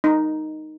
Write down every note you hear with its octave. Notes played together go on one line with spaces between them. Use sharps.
D#4